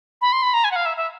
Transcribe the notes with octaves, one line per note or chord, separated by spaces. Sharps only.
B5
C6
B5
A#5
G#5
F#5
F5
E5
E5